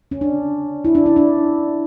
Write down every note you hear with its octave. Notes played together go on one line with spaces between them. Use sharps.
C#4
D4
E4
D4
E4
D4